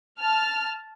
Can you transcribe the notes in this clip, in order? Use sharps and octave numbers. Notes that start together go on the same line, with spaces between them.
A5 F6